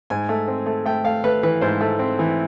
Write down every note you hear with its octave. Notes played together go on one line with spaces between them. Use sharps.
G#2 G#5
A3
C4
A3
A3 G5
A3 F5
A3 B4
E3 B4
G#2 C5
A3
C4
E3